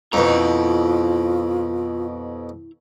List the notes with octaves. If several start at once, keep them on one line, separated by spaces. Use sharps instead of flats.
F2 B2 E4 F4 A#5